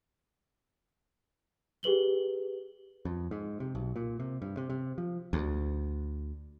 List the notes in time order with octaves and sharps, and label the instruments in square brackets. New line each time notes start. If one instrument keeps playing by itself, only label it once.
[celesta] G4 G#4 B4 F#7 G7
[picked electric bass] F2
G#2
C3
B1
A#2
C3
G2
C3
C3
F3
[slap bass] D2